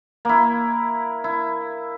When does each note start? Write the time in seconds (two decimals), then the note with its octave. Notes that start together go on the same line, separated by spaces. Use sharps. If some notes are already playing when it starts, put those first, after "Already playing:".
0.25 A#3 E4
1.24 E4